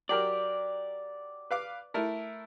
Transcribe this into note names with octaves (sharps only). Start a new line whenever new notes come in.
F#3 G4 A#4 D5
B4 F5 D6
A3 E4 A#4